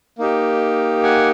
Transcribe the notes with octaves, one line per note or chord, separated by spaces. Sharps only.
A#3 D#4 G4
F#5 G#5